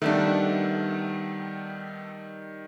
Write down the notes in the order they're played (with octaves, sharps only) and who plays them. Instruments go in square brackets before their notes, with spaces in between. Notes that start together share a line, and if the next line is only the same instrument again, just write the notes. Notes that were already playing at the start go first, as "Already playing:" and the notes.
[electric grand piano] D#3 G3 [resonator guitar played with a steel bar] A3 B3 D4